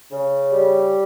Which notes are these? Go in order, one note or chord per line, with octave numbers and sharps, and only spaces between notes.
C#3
G3